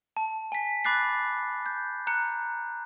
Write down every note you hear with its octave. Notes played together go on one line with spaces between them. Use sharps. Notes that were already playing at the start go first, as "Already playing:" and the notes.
A5
G#5 B6
B5 D6 F#6 A6 C7
G6
A#5 F#6 C#7